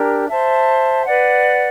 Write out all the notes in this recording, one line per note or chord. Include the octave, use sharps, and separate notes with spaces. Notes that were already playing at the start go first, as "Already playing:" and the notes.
Already playing: D4 G4 A#4
C5 E5 A5
B4 D5 F#5